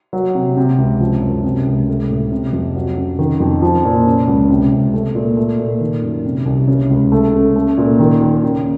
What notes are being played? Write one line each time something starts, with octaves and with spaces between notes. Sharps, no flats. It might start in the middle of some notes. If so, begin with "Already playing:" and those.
F#3
C3
C3
C#2
F3
F#2
C3
C#2
A3
A2
C3
F2
F#3
C#3
D#3
F2
F3
A#2
C#3
C#2
C3
C#2
A3
A#2
A3
A#2
D#3
F#2
C3
C2
C#3
C#2
A3
C#3
A3
A#2
D#3
D#2
C#3